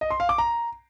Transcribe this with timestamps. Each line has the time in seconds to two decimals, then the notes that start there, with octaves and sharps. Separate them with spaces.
0.01 D#5
0.11 C6
0.20 F5
0.29 D6
0.38 A#5